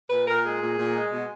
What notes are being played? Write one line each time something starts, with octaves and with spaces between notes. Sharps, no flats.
A#2 B4
A#2 A#4
G#3 G#4
A#2
A#2
G#3
B2